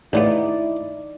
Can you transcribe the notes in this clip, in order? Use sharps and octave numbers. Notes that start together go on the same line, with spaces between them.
A1 C#3 B3 D#4 E4 D5